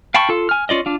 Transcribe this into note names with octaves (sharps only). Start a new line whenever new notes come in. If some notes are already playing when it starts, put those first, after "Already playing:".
F5 G5 A5 B5 C#6
F4 A4
G#5 F6
C#4 F4 D5 D#5
D4 F4